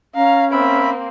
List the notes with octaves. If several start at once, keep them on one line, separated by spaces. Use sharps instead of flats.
C#4 F5 A#5
A#3 C4 E5 B5